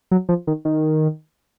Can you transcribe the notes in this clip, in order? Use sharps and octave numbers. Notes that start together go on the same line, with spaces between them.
F#3
F3
D#3
D#3